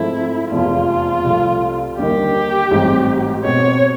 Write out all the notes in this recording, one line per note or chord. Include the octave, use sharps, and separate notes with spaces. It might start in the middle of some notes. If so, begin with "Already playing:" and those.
Already playing: G#2 F3 A3 C4 E4
F1 E2 C3 F3 G#3 F4
C2 C3 F3 A3
D#2 D3 G3 A#3 D#4 G4
A1 G#2 E3 G3 C4
B2 G#3 C4 C#5